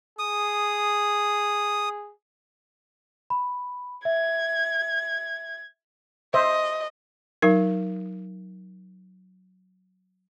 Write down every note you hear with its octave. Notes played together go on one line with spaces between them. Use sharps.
G#4 D#6
B5
E5 G#6
C5 D#5 E5
F#3 D#4 A#4